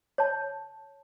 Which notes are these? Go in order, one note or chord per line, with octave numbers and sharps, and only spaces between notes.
C#5 A5